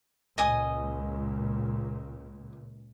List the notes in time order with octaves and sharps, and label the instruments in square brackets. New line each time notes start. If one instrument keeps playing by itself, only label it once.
[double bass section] C#2 A#2 [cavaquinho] D#5 G#5 D#6